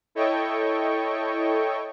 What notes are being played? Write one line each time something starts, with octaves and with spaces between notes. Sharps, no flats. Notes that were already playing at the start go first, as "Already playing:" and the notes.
E4 A4 C#5 D#5 G5 C#6